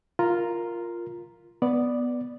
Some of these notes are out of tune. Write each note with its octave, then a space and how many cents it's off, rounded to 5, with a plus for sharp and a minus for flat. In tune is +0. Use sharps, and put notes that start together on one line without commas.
F4 +0 A#4 +0 A#5 +0
B3 +0 D5 +0